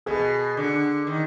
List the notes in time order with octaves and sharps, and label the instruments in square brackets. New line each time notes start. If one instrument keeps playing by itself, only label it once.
[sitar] B2 [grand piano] G#4
[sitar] D3
D#3